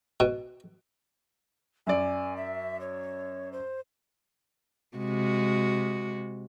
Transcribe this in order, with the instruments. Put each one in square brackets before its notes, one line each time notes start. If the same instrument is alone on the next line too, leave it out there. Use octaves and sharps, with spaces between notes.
[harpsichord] B2
[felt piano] F#2 D5 [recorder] G#5
[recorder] E5
C#5
C5
[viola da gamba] C3 G#3 F#4